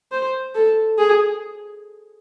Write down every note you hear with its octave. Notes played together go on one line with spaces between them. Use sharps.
C5
A4
G#4